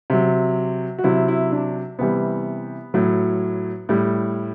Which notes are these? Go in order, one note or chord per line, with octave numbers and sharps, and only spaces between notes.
C3 F#3
F#4
C3 F#3 E4
E4
D4
C3 E3 G3 B3
A2 F#3
A2 G3